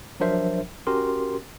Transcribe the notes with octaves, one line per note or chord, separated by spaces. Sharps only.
F3 F#3 D4 A#4 C5 E5
C#4 F#4 G4 A#4 C6